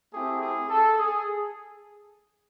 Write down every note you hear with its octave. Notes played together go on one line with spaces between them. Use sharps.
A3 C4 E4 G4 G#4
G#4
A4
G#4